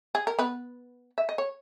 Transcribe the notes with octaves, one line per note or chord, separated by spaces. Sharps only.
G#4
A#4
B3 B4
E5
D#5
C#5